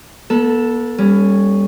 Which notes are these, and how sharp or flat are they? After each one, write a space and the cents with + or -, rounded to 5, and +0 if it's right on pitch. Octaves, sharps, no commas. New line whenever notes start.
B3 -40 A4 +0
G3 +25 C#4 +0